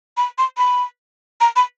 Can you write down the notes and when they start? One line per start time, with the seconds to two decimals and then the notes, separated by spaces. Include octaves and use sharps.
0.17 B5
0.38 C6
0.58 B5
1.41 A#5
1.56 B5